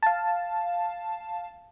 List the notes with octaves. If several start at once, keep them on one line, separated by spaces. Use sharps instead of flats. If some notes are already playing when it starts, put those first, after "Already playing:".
F5 A5